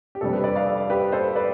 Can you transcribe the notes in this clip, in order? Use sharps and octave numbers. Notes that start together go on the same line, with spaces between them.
G4
F2 C3 G3 D4 A4
G4 B4
B4 D5
D5 F5
A4
G4 B4
A4 C5
B4 D5